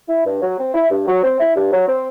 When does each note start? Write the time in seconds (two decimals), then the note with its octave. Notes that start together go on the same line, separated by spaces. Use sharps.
0.09 E4
0.25 G2
0.41 F#3
0.58 C4
0.74 E4
0.90 G2
1.07 F#3
1.23 C4
1.39 E4
1.56 G2
1.72 F#3
1.88 C4